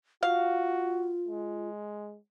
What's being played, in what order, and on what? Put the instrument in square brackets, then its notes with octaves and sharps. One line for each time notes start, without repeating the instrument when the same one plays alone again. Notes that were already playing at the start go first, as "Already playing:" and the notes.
[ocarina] F4 [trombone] F#4 [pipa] F5
[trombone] G#3